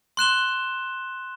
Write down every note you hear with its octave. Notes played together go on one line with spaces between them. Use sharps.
C6 F#6 E7 G7